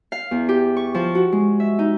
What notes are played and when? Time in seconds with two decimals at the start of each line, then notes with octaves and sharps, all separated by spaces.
0.12 F5
0.31 E2
0.49 G4
0.77 C#6
0.94 F3
1.15 F#4
1.32 G#3
1.60 E5
1.79 D#4